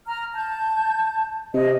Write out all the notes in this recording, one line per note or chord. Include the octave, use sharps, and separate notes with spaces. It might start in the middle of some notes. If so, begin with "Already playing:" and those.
A#5 F6
A5 G6
C3 D#5